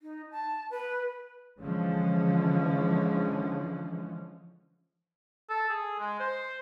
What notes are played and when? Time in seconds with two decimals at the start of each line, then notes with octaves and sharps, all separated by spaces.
0.02 D#4
0.32 A5
0.71 B4
1.60 D3 E3 F3 G#3 C#4
5.50 A4
5.69 G#4
5.99 G#3
6.20 C5